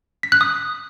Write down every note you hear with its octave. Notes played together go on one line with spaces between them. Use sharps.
B6
F#6
D#6